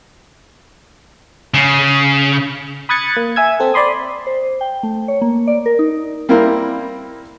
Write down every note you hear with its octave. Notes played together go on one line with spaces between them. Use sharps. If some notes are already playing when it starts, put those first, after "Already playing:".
C#3
B5 D#6 F#6 G#6 A6 C#7
A#3
E5 G#5 E6 G#6
C4 A4
D5 B5 C6 D#6
C5
G5
A3
C#5
A#3
D5
A#4
D#4
G3 A#3 C4 E4 A#4